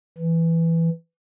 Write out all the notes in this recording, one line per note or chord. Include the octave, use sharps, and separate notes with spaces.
E3